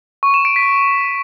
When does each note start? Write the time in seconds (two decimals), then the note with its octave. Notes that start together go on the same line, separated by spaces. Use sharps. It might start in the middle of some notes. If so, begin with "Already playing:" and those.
0.23 C#6
0.34 E7
0.45 D7
0.56 B6